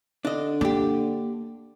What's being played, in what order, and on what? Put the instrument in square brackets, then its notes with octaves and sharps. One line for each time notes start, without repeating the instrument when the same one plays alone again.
[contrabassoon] D3 [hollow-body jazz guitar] D4 D#5
[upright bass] A#3 [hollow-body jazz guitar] D4 G4